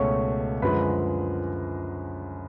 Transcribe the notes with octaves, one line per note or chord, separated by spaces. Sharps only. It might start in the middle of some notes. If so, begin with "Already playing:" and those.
Already playing: C#2 B2 A3 C#4 C#5 C#6
F#2 D3 F3 G#3 B4 B5